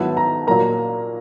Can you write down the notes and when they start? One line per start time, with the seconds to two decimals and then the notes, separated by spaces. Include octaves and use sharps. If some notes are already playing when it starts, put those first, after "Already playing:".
Already playing: G#2 D#3 F#3 B3 E4 A5
0.17 A#5
0.47 A#2 F#3 A#3 A#5